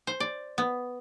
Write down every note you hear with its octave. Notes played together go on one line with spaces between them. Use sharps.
C5
D5
B3